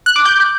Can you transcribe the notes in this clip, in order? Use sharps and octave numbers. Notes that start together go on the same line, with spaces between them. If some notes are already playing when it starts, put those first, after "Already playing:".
F#6
D6
G6